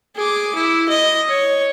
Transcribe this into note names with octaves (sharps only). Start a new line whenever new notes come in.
G#4 D6
E4
D#5
C#5